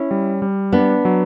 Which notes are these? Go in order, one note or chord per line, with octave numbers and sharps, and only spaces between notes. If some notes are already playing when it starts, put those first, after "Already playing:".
Already playing: C#4 E4
G3
G3
B3 D4
F#3